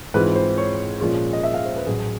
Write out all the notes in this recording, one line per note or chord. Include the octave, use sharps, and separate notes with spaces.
G#2 E3 G#3 C4 F4 B4
C5
C#5
A#2 F3 G#3 C#4 F4
D#5
E5
F5
C5
B4
A1 A2 F#3 G#4